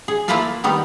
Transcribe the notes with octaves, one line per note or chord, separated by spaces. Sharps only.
G#4
A#3 E4 F4 B4 F5 A5
D#3 G3 B3 D#4